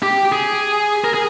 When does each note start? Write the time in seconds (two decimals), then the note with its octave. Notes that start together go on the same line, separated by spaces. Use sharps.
0.02 G4
0.32 G#4
1.04 A#4
1.14 G#4